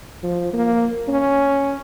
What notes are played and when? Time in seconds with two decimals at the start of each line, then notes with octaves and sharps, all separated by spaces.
0.23 F3
0.54 A#3
1.08 C#4